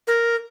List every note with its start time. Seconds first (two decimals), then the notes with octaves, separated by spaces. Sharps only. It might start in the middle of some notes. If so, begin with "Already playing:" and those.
0.07 A#4